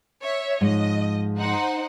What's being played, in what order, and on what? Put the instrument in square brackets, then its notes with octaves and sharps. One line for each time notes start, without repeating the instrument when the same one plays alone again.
[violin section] C#5 E5
[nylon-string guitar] G#2 F3 G#3 [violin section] D#5
[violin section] D#4 C5 F#5